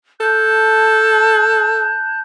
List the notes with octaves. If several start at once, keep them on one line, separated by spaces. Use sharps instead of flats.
A4 A5 F#6 G6